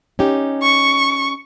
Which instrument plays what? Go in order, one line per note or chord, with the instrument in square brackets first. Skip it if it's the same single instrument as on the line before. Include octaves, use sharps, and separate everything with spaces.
[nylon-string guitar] C#4 D#4 G4
[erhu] C#6